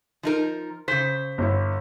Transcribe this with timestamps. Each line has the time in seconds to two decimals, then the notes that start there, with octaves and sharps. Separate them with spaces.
0.23 F3 D#4 A#4
0.88 C#3 C5 B6
1.38 G1 E4